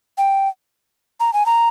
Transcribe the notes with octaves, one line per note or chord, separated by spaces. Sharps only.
G5
A#5
G#5
A#5